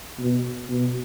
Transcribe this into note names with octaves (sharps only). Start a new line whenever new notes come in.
B2
B2